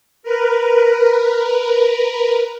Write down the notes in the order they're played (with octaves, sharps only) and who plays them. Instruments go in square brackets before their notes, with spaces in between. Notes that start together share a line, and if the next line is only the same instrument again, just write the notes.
[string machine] A#4 B4